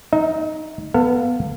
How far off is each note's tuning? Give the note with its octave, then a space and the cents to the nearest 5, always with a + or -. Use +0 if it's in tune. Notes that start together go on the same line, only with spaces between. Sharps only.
D#4 +0 D#5 +45
B3 +0 A4 +40 F5 +0